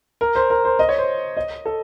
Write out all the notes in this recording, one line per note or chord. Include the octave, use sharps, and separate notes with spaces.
A#4
C5
A#4
C5
D#5
C#5
C5
D#5
A4